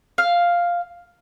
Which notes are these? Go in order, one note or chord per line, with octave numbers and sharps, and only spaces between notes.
F5